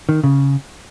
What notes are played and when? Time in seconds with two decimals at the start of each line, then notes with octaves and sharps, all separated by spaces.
0.09 D#3
0.24 C#3